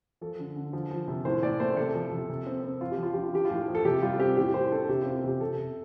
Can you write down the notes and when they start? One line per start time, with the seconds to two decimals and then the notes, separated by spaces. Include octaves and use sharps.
0.21 F3 A4
0.39 D3
0.56 D3
0.73 F3
0.91 F3
1.08 C3
1.25 A2 C5
1.43 A2 D5
1.60 A3 C5
1.77 C3 A4
1.95 F3
2.11 C3
2.30 C3
2.47 C4
2.64 C4
2.81 F3 F4
2.91 G4
2.98 F3 F4
3.13 D4 G4
3.24 F4
3.33 F3 G4
3.45 F4
3.51 A2
3.68 F3
3.75 A4
3.85 C3 G4
4.02 G3 F4
4.19 C4 G4
4.37 A2 G4
4.54 A2 C5
4.72 D4 A4
4.89 C3 G4
5.02 C4 F4
5.24 C3 G4
5.41 C3 A4
5.58 C3